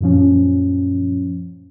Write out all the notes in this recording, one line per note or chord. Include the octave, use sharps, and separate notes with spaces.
F#2 A#2 F3 C#4